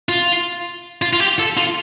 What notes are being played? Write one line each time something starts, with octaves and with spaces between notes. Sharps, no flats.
F4
F4
F4
G4
A4
F4